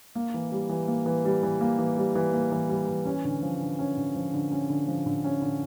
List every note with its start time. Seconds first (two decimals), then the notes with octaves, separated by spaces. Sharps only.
0.15 A#3
0.34 E3
0.52 G3
0.69 E3
0.88 A#3
1.06 E3
1.25 G3
1.43 E3
1.61 A#3
1.79 E3
1.97 G3
2.15 E3
2.33 A#3
2.52 E3
2.69 G3
2.88 E3
3.05 C#4
3.25 D3
3.42 F3
3.60 D3
3.79 C#4
3.97 D3
4.15 F3
4.33 D3
4.52 C#4
4.70 D3
4.88 F3
5.06 D3
5.24 C#4
5.42 D3